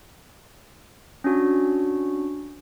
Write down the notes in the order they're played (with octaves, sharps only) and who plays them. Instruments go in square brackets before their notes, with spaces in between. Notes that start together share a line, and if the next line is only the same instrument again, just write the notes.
[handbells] C#4 D4 F#4